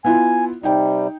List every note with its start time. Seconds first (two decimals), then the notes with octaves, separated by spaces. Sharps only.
0.05 B3 E4 F4 G#5
0.63 C3 G3 D#4 G5